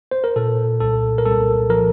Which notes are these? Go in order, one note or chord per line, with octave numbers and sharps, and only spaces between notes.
C5
A#4
A#2 A4
C2 A4
A#4
C2 A4
F3 A#4